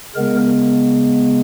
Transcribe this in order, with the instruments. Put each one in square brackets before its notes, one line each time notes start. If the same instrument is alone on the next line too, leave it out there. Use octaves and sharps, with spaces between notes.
[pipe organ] C#3 G#3 B3 A#4